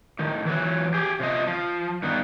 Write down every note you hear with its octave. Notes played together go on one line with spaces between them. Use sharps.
A2 D#3
E3 F#3
G4 G#4
C3 F3 D#5
F3
G2 D#3 B3